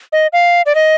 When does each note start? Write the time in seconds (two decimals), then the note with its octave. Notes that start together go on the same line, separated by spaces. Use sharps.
0.13 D#5
0.33 F5
0.66 D5
0.75 D#5